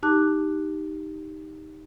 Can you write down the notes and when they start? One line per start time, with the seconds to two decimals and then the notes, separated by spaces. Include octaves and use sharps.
0.03 D#4 G4 A5 D6 F#6